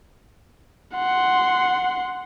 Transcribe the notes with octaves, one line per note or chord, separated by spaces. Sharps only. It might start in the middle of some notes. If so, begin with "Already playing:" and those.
F#5 C6